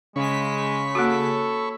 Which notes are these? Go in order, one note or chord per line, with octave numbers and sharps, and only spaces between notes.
C#3 G#3 C#5 B5 C#6 B6
A#3 F#4 A4